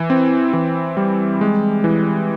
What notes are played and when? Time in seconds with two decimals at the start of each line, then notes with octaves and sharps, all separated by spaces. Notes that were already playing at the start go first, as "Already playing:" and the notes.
Already playing: E3
0.10 C4
0.53 E3
0.97 G3
1.41 G#3
1.84 E3